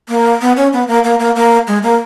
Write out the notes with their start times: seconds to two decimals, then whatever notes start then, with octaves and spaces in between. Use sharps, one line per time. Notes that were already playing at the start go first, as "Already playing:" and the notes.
0.09 A#3
0.41 B3
0.57 C#4
0.73 B3
0.88 A#3
1.04 A#3
1.20 A#3
1.36 A#3
1.67 G#3
1.83 A#3